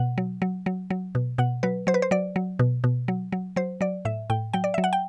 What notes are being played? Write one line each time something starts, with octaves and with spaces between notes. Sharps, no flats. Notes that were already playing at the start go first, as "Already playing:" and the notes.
Already playing: B2 F#5
F#3
F#3
F#3
F#3
B2
B2 F#5
F#3 B4
F#3 C5
B4
C5
F#3 D5
F#3
B2
B2
F#3
F#3
F#3 C5
F#3 D5
A2 E5
A2 G5
F#3 G5
D5
F#3 E5
F#5
G5